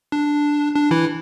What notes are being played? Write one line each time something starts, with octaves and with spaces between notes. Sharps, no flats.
D4
D4
E3 E4